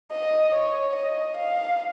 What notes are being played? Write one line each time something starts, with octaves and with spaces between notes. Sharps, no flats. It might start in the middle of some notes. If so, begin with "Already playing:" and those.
D#5
C#5
D#5
F5